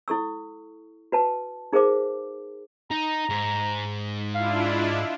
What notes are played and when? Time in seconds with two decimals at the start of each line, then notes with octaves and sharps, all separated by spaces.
0.08 E4 A4 C#6 E6
1.12 F#4 B4 A5
1.73 D#4 G#4 A#4 C5 F5 D6
2.91 D#4 A#5
3.29 G#2
4.35 D4 E4 F4 F5
4.72 D#5